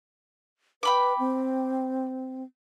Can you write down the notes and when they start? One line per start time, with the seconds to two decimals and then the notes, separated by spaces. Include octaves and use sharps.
0.83 B4 G5 B5 D6
1.19 C4